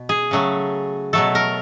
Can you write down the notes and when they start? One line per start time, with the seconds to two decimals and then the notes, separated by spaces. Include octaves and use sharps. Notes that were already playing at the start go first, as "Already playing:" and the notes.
Already playing: B2
0.09 G#4
0.31 C#3 F#3 A3
1.13 B2 F#3 A3 A4
1.35 A#4